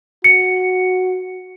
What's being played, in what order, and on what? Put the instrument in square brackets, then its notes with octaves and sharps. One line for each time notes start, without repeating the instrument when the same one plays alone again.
[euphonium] F#4 [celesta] C#7